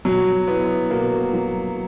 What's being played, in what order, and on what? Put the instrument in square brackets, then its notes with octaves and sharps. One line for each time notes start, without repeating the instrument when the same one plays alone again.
[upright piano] B2 [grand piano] F#3
[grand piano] B3 [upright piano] E4
[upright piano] B2 [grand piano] A#3
[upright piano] F#3